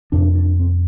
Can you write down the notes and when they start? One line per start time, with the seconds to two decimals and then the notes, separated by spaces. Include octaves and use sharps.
0.12 F2 C3 D4
0.35 D4
0.59 C4